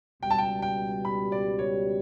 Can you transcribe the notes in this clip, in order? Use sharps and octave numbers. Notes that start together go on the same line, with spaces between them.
C#2 B2 G3 G5
A5
G5
G5
B5
D5
C#5